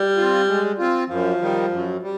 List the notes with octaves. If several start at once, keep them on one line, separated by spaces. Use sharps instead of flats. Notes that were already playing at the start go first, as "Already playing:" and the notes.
Already playing: G3
C4 F4
G#3
C4 F4
F#2 F3
D#3 G3
F#2
G3